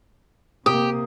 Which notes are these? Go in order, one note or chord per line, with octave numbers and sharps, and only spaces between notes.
C3 A#3 G4 D#6